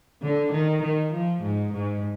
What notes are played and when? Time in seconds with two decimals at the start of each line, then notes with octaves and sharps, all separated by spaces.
0.22 D3
0.52 D#3
0.83 D#3
1.13 F3
1.43 G#2
1.73 G#2